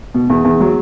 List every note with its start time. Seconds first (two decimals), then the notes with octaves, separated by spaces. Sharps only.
0.14 B2
0.30 E2
0.45 E2
0.60 F#3